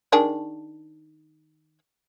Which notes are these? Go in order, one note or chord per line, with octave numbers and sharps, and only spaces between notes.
D#3 D4 G#4